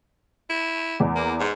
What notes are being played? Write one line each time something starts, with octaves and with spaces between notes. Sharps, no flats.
E4
E2
A#3
G#2